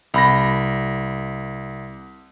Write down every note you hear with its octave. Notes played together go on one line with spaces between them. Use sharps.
C2 B5 A#6